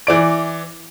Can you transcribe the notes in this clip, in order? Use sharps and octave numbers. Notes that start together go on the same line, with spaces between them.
E3 D5 D7